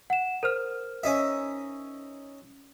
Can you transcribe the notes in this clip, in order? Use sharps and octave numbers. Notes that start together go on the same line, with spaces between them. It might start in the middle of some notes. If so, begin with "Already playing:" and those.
F#5 E7
A#4 C5 F6
C#4 D#4 E5